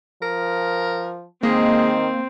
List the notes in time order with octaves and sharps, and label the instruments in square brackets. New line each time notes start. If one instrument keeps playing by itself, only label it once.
[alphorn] F3 [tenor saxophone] A#4
[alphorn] D#3 [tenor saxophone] G#3 [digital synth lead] A#3 [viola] C4